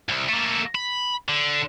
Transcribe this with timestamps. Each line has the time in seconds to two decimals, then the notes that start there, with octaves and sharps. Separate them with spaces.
0.09 C2
0.29 A3 A#3
0.75 B5
1.29 D3